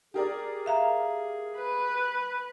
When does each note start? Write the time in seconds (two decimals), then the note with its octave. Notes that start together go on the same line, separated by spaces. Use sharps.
0.14 G4 G#4 A#4 D5
0.66 E5 F5 A#5
1.58 B4